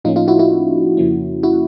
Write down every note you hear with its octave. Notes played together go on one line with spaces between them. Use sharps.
A2 F3 A#3 C#4 D#4 F4
D#4 F4
E4 F#4
E4 F#4
F2 C#3 F3 A#3 C#4
E4 F#4